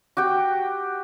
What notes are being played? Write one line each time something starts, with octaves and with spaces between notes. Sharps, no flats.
F#4 G4 G5